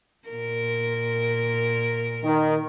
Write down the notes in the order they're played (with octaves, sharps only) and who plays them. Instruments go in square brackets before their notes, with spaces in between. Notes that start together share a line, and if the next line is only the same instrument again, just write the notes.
[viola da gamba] A#2 A#4
[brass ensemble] D#3